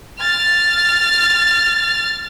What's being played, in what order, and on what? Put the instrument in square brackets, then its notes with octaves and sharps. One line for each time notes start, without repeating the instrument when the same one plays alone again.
[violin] F6 A6